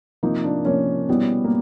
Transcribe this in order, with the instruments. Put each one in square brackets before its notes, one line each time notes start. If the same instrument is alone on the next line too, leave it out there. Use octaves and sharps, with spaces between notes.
[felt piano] C3 F3 A#3 [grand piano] D#4
[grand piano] D4
[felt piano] C3 F3 A#3 [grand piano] C#4
[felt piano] B2 G3 B3 E4
[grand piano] A#3